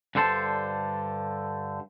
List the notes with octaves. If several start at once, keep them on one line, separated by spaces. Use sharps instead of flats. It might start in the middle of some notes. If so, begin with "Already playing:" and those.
G2 D3 A4 C5 A5